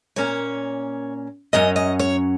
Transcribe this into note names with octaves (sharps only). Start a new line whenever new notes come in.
A#2 A#3 C#4 C#5
F#2 F#3 C#4 D#5
D#5
C#5